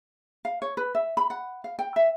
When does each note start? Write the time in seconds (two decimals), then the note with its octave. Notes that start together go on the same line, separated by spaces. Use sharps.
0.45 F5
0.62 C#5
0.77 B4
0.95 E5
1.17 B5
1.30 F#5
1.64 F5
1.79 G5
1.96 E5